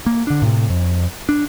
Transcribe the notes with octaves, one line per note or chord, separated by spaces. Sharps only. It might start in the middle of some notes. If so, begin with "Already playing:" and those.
A#3
D3 D4
A2 C3
F2
D4